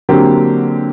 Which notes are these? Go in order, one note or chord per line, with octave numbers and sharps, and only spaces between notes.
D3 F#3 A#3 C4 G4